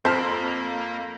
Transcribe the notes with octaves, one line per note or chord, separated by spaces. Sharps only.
F2 A#3 C5 A5 F6 G6 B6 E7